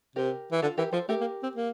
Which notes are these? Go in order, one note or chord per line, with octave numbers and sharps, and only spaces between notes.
C3 G4 A#4
E3
D3 F4 A4
E3 G4 A#4
F3 A4 C5
A3 G4 A#4
A#3
C4
A#3